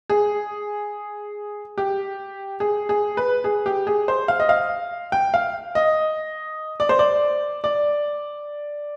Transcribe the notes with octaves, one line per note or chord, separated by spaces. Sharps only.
G#4
G4
G#4
G#4
B4
G#4
G4
G#4
C5
F5
D#5
F5
G5
F5
D#5
D5
C5
D5
D5